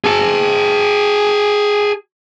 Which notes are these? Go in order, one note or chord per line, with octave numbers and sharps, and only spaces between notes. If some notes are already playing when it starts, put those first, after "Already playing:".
G#4 A5